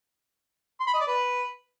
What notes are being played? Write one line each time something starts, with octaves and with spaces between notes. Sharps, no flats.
C6
B5
D#5
D5
B4